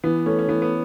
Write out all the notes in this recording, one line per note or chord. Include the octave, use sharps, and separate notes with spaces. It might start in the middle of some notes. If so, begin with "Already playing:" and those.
E3 B3
A3 C#4
C#4
E3 B3
B3